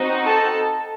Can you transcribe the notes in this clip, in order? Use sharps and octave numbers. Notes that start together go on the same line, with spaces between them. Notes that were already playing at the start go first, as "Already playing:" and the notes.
Already playing: C4 D#4 F#4
A4 A5